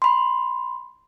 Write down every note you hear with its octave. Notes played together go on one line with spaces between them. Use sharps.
B5 C6